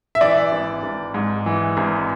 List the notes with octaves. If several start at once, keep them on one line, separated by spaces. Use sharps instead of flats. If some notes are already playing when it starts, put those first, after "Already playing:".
E5
E3 D5
G#1
G#1
G#2
E3
G#1